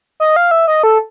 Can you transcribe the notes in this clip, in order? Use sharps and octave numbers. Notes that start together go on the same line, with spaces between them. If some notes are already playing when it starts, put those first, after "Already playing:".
D#5
F5
E5
D#5
A4